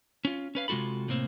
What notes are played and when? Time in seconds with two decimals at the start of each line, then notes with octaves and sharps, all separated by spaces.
0.25 C#4 F4
0.55 C#4 B4 F5
0.68 C3 G#3 F4 F#4 A4 B5
1.08 A2 C3 A#3 C4